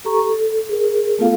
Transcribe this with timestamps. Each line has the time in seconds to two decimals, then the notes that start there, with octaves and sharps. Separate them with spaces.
0.05 G4 A4 A#5 C#6
0.29 A4
0.69 G#4 A#4
1.19 A3 B3 F4 A4 F5